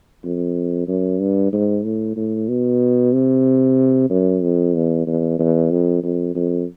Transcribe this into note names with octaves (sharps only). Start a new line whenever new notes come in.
F2
F#2
G2
G#2
A2
A2
B2
C3
F#2
F2
E2
E2
E2
F2
F2
F2